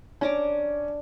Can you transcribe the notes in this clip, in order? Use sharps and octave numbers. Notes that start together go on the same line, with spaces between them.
C#4 D4 A#5 D6